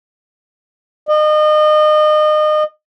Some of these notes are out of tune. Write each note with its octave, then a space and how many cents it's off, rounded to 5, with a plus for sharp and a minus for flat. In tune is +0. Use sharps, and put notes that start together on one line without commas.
D#5 -30